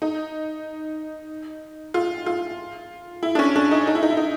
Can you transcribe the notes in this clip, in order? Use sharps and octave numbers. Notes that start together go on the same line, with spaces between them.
D#4
F4
F4
E4
D4
C#4
D4
D#4
D#4
E4
D#4
E4
D#4